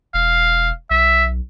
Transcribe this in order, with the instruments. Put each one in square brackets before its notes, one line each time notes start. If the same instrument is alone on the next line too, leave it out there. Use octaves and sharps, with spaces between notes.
[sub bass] E1 [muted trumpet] F5
[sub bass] B1 [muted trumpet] E5